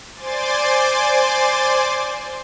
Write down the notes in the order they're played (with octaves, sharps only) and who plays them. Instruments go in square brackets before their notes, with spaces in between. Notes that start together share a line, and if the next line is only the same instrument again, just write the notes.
[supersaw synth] C5 D5 G#5 C6 D6 A6